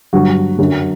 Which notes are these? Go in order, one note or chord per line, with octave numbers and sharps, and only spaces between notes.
G2 D3 F#3 F#4
F#2 D3 F#3